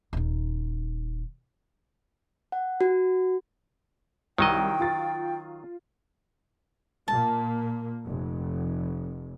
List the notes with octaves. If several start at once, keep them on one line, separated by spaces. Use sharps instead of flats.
D#1 D#4
F#5
F#4
C2 D#3 F#3 D#5 G5
F4 A6
A#2 A#3 A5
F1